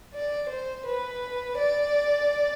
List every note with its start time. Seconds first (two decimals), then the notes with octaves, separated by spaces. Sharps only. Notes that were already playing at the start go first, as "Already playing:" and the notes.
0.14 D5
0.49 C5
0.86 B4
1.58 D5